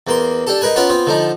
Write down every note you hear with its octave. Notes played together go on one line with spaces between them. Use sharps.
E2 A#3 C6
D4 G4 A4
D#4 G#4 A#4 B4 G#5
B3 C#4 F4 A#4 B4
B3 C4 F4
D3 F3 D#4